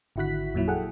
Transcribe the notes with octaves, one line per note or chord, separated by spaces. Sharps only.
G#1 D3 E4 F#4 F#6 B6
F2 A#2 F#3 E4
G#4 A4 F#5 G5